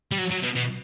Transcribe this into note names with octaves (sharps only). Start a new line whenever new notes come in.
G3
F#3
F#3
B2
B2